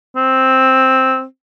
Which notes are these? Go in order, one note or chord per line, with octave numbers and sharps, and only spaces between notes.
C4